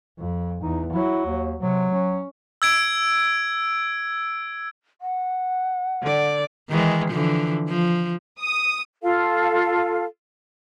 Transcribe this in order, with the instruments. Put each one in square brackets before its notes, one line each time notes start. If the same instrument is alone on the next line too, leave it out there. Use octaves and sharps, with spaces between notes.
[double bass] F2
[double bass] E2 [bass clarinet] D#4
[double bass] F#3 [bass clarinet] E4
[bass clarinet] D#2
[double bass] C3 [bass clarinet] F#3
[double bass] C#4
[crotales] E6 G#6 D7
[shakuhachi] F#5
[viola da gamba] D3 D5
D#3 E3 G#3
D3 E3 F3
F3
[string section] D#6
[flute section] F4 A4 F5